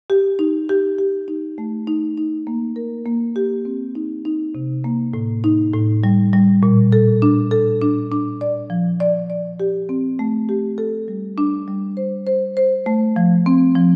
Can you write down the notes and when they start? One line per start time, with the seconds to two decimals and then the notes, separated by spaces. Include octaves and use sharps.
0.10 G4
0.39 D#4
0.69 G4
0.98 G4
1.28 D#4
1.58 A3
1.87 D#4
2.18 D#4
2.47 A#3
2.76 A#4
3.06 A#3
3.36 G4
3.65 C4
3.95 D#4
4.25 D#4
4.55 C3
4.84 A#3
5.14 A2
5.44 D#4
5.73 A2
6.04 G3
6.33 G3
6.63 A#2
6.92 A4
7.22 D4
7.51 A4
7.81 D4
8.12 D4
8.41 D5
8.70 F3
9.00 D5
9.30 D5
9.60 G4
9.89 C4
10.19 A3
10.49 G4
10.78 A4
11.08 G3
11.38 D4
11.68 G3
11.97 C5
12.27 C5
12.57 C5
12.86 A3
13.16 F3
13.46 C4
13.75 F3